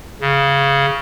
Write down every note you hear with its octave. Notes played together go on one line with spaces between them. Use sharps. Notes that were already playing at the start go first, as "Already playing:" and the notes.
C#3